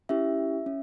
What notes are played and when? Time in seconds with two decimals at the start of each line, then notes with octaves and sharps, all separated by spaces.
0.09 C#4 E4 G4 E5
0.66 C#4